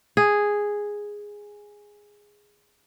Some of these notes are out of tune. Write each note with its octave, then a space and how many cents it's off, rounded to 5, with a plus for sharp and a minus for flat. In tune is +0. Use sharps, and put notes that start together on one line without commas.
G#4 -5